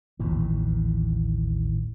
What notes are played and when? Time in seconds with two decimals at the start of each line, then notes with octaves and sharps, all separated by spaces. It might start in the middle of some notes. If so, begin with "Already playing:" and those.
0.19 A1 D#2 A#2 E3